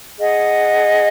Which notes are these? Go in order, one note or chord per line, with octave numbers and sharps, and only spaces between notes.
G#4 D#5 F#5